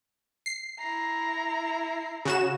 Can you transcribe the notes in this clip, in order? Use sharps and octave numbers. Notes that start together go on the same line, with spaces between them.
C7
E4 A#5
C#3 F#4 E7